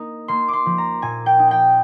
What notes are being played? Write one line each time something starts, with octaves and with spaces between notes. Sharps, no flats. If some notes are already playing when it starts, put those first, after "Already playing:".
Already playing: A#3 D#4
A#3 C6
C6 D6
F3
A#5
A#2 G#5
G5
D#4
G5